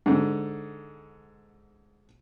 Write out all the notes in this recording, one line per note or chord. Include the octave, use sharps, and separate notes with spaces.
G#2 D3